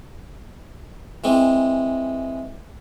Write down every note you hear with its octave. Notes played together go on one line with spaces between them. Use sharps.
E3 G#3 C4